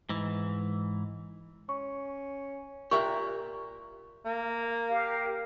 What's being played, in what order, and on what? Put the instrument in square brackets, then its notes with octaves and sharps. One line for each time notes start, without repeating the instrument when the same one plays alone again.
[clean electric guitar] G#2 E3
[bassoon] C#4 [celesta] C#6
[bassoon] A#2 [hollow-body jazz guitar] G4 A#4 E5 [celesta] C#6
[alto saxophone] A#3
[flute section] G4 A#4 F5